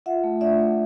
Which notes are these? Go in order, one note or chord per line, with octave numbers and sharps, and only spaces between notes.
F4 E5 F#5
A3
D4 D5 E5
A3